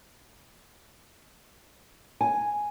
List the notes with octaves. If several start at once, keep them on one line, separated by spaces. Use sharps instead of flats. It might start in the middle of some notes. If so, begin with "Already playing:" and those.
G#5